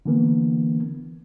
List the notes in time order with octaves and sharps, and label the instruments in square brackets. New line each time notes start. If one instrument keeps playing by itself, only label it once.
[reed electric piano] D3 E3 A#3 B3